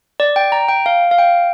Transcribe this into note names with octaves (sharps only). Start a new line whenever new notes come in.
D5
G5
A#5
G5
F5
F5
G5